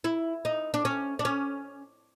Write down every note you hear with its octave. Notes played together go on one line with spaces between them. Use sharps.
E4
D#4
D4
C#4
D4
C#4